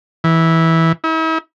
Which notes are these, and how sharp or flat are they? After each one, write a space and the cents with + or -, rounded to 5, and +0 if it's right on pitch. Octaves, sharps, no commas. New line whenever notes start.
E3 -15
E4 -45